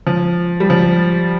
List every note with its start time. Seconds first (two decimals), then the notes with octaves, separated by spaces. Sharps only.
0.07 F3
0.60 G3
0.70 F3